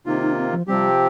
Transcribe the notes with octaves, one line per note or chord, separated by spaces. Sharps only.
C3 D#3 A#3 D#4 F4
D#4
D4
C4
F3
C3 F3 G3 C4 G4